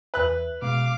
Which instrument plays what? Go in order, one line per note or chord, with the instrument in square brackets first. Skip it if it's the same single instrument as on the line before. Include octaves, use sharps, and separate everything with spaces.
[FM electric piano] E2 E5 [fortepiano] B4 F#6
[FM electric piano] B2 G#3 [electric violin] F5 D6